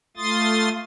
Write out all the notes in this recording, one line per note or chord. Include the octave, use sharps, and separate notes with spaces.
A3 F4 C6 D#6 A6